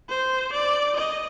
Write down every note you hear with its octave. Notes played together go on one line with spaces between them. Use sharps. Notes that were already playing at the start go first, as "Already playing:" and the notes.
C5
D5
D#5